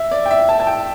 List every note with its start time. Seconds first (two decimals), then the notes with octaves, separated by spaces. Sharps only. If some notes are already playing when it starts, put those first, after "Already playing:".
Already playing: E5
0.11 D5
0.26 G5
0.31 E5
0.49 A5
0.60 A5
0.67 G5